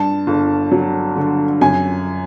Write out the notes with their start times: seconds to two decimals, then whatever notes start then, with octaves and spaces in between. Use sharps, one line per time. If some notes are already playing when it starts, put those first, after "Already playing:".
Already playing: G2 A5
0.27 G1
0.71 F#3
1.16 D3
1.61 F#2 G#5